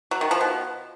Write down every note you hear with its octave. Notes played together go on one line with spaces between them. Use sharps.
F#3
D#3
F3
B2